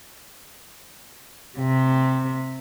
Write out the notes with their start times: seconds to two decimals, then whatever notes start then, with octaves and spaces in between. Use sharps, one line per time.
1.58 C3